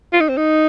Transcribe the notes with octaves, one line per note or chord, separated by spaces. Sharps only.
F4
D#4
C4
D#4